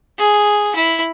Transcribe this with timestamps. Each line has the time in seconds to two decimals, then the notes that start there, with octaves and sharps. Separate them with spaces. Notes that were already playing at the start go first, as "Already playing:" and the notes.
0.19 G#4
0.75 E4